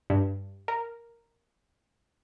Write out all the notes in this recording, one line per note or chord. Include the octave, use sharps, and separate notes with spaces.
G2
A#4